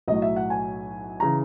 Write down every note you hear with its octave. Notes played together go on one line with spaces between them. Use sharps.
B1 A2 F#3 D#5
E5
F#5
G#5
C#3 E3 A#5